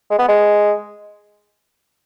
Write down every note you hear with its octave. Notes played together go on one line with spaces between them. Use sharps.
G#3
B3
G#3